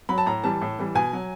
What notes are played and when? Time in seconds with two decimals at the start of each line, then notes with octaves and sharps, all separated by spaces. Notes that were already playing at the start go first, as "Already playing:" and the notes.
0.09 F#3 B5
0.18 A5
0.26 A2 A#5
0.43 E3 G3 A5
0.61 A2
0.79 E3 G3
0.95 B2 G#5
1.13 F#3